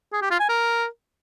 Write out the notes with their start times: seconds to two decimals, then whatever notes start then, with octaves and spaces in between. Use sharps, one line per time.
0.13 G#4
0.22 G4
0.31 F4
0.40 G#5
0.49 A#4